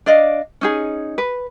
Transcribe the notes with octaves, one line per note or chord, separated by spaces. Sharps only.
D4 D5 D#5 F5
C#4 D#4 G#4
B4